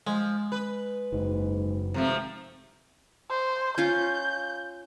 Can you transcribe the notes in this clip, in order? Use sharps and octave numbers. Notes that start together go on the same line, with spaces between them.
F3 G#3
B4
F#1 G#2
G#1 C3 F3 A3
C5
C#4 F4 F5 G6